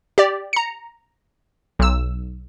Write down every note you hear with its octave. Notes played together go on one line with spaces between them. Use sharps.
G4 D5
A#5 C#7
B1 E6